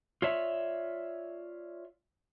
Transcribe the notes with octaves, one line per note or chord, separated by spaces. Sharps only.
F4 C#5 D5 E5